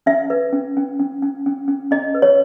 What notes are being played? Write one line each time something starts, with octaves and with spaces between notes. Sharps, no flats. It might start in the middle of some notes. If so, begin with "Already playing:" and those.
C#4 E5
B4
C#4
C#4
C#4
C#4
C#4
C#4
C#4 D#5
B4
C#5